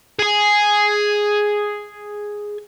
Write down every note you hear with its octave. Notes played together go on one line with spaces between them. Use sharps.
G#4 G#5